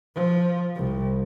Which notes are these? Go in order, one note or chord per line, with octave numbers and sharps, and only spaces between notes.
F3
C2